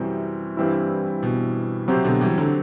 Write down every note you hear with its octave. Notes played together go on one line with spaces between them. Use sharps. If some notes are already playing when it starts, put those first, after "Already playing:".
Already playing: F#2 C3 E3 G3 C4 F#4
G2 E3 G3 C4 E4
B2
C3 F#3 C4 G4 C5
B2 D3
E3 G3
D3 F#3